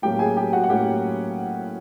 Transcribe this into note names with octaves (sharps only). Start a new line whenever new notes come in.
A2 F#3 A#3 C#4 G4 G5
G#4 G#5
G4 G5
F#4 F#5
F#5
A2 F#3 A#3 C#4 G4 G5